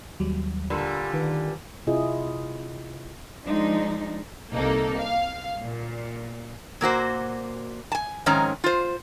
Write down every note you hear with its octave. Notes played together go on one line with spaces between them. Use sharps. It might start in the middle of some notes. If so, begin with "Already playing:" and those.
D#2 F#3 G3
A#2 D3 G3 B5 C6 E6
D#3 B4
C3 E4 F4 G#4 D#5
F3 G#3 D4 D#4
C2 C3 A#3 D#4 A4
F5
A#2
A#2 A#3 F#4 C5
G#5 A5
F2 G#2 D#3 C#4 A#5
F4 C5